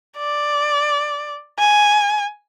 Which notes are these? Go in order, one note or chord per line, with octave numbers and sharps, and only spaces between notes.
D5
G#5